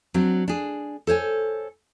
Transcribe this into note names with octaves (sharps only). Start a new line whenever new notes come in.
F#3 C4 D4
D4 G#4
A4 C5 C#5 G#5